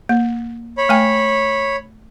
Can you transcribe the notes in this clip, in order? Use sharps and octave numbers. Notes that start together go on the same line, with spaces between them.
A#3
C#5 B5
A3 G5 G#5